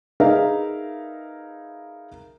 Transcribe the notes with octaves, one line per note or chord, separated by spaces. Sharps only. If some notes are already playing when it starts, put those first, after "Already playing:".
D#4 G#4 A#4 B4 E5 F5